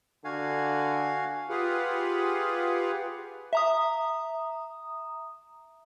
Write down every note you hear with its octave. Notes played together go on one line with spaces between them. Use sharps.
D3 F#4 F5 G#5
F4 G4 G#4 B4 F5 F#5
E5 A#5 D#6